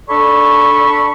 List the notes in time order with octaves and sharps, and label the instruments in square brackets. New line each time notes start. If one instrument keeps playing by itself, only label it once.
[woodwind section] D4 A4 D5 B5 C#6